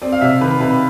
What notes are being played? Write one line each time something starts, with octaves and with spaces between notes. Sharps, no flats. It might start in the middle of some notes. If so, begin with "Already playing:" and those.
C4 D5
F5
C3 E5
D#3 B4
C3 B4